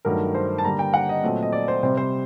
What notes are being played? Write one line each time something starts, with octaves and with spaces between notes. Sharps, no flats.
G2 D#3 F#3 A3 A#4
C5
A5
D3 G3 A#3 A#5
G5
F#5
D#5
A#2 F#3 A3 C4
D#5
D5
C5
C3 G3 C4 C5
C5